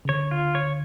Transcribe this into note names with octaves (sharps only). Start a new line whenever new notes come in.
C#3
D3 C#5
F4
C#5